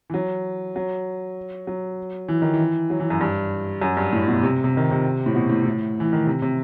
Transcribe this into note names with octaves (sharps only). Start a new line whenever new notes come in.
E3
F#3
F#3
F#3
E3
D#3
E3
F#3
E3
F#2
G2
F#2
G2
A2
B2
C3
C3
D#3
C3
A2
B2
A2
A2
E3
D#3
C3
C3